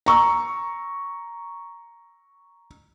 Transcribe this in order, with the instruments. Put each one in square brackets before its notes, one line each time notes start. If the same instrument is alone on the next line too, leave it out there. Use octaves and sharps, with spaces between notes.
[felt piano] A#5 C#6 E6